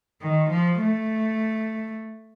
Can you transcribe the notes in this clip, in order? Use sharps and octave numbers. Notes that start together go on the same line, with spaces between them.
D#3
F3
A3